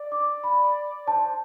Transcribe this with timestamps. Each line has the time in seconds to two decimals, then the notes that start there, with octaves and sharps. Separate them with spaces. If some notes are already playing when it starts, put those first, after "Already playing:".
Already playing: D5
0.12 D6
0.44 B5
1.07 C5 A5